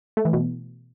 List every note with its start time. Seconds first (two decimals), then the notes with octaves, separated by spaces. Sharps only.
0.17 A3
0.25 E3
0.33 B2